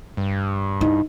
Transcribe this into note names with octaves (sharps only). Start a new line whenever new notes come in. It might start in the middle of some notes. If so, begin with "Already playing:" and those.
G2
D#4 E4